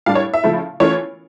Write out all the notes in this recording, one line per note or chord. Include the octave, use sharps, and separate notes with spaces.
A2 G3 D4 F5
C#5
E5
C#3 F3 A3 E4
E3 A3 C#4 F4 C#5